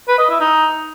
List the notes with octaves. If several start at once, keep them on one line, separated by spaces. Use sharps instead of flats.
B4
D#5
E4
D#4